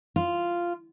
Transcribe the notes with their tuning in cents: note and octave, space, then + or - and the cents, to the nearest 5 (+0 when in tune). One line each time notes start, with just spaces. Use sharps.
F4 -10